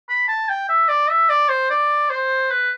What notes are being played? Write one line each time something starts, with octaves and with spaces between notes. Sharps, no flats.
B5
A5
G5
E5
D5
E5
D5
C5
D5
C5
B4